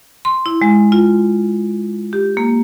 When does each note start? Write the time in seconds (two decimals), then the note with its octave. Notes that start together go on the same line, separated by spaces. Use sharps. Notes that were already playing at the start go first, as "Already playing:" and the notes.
0.25 C6
0.46 E4
0.62 G#3
0.92 F4
2.13 G4
2.37 A#3